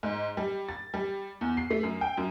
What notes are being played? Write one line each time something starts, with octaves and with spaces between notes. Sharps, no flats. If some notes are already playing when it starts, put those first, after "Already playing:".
G#2
G3
A6
G3
E2
C7
A3
F#2
G5
F#2